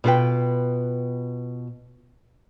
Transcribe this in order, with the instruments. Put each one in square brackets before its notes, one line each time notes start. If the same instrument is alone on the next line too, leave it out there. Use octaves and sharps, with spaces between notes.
[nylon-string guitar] B2 F4 A4 B4 G5